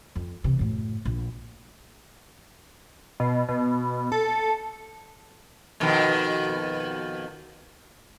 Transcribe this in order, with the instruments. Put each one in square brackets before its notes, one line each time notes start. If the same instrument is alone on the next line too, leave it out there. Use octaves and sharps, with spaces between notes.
[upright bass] F2
C3 E3
F#2 A2
A#1
[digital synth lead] B2
B2
A4
[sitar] F2 B2 D#3